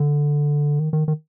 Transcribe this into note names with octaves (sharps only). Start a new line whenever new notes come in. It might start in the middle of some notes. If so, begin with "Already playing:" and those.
Already playing: D3
D#3
D#3
D#3